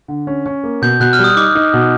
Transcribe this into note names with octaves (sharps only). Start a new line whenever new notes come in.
D3
C#4
C#4
A#3
B2 G6
B2 F#6
F6
G3
D#6
D#4 D6
D#4
B2